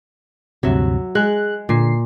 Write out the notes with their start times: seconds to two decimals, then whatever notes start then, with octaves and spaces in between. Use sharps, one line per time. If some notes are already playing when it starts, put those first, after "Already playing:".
0.63 D2 G2 C3 F#3 E5
1.15 G#3 G#4 F#6
1.69 A#2 D3 C7